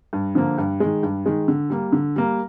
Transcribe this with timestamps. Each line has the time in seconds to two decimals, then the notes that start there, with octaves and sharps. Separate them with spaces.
0.13 G2
0.35 D3 F3 A#3
0.58 G2
0.80 D#3 G#3
1.03 G2
1.26 D#3 G#3
1.48 D3
1.70 G3 A#3
1.93 D3
2.16 G3 A#3